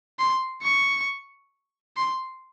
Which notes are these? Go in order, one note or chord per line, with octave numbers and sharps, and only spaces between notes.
C6
C#6
C6